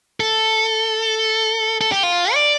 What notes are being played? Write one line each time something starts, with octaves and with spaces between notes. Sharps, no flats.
A4
A4
G4
F4
D5